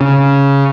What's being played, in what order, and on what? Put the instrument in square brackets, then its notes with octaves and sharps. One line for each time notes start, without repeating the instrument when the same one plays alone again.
[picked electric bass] C#3